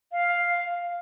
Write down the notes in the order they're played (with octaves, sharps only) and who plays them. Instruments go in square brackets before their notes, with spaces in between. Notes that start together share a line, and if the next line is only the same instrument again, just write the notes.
[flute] F5